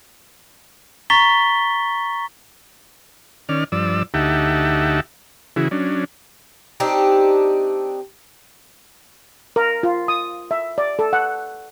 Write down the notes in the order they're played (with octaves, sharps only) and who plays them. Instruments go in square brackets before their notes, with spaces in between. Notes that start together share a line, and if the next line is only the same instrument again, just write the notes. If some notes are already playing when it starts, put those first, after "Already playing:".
[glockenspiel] A#5 C#6 A6 B6 G7
[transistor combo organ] D#3 C#4 D5 F6
G2 F3 D5 E6
D2 D#4 G4 E5 F#5 A5
C#3 E3 E4 F#4 G#4
F#3 C#4 D4
[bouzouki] C4 D4 D#4 G4
[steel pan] A#4
F4
D#6
E5
D5
A4
F#5